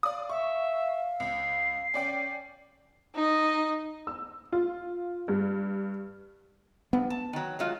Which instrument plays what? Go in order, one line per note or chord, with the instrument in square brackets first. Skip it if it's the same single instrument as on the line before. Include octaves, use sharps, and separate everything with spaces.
[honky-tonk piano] D5 D#6 [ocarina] F5
[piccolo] E5 [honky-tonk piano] C#6
[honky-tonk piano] C#2 [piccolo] C7
[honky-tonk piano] C#4 D5 G5
[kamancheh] D#4 D#5
[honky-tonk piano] E6
F4
G2
[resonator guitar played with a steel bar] G2 [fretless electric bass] B3
[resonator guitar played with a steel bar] A5
D#3 F#3
F#3 G#3 F4